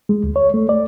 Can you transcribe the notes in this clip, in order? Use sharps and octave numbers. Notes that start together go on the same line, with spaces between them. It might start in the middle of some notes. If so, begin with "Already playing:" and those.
G#3
D2
C#5
A3
D5